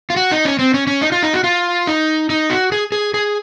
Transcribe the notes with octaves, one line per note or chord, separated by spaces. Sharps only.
F4
F#4
D#4
C#4
C4
C#4
C#4
D#4
F4
D#4
F#4
F4
D#4
D#4
F#4
G#4
G#4
G#4